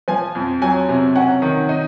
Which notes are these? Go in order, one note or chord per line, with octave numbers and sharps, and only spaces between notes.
F3 G#5
F2
F#3 G#5
C3
C#4 F#5
D#3
D#4